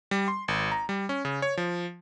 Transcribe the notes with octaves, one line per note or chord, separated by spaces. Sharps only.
G3
C6
G#1
A#5
G3
C#4
C#3
C#5
F3